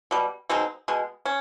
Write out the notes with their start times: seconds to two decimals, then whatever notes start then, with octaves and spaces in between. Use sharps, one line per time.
0.11 B2 G3
0.49 B2 G#3 C4 D#4
0.88 B2 G#3
1.25 C#4